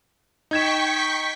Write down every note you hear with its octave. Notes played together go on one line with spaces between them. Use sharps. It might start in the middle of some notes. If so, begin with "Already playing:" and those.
D#4 G5 C#6 G#6 B6 E7